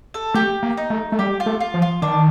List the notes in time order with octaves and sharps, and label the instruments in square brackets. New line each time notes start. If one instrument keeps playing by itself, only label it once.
[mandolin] A4
[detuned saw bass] A3 [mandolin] G4
[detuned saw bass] A#3
[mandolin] D#4
[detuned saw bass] A3
A3
[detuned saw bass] G3 [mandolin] G4
[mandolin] F4
[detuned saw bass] A3
[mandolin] F4
[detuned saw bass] F3
[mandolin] F4
[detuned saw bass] D#3 [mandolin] D4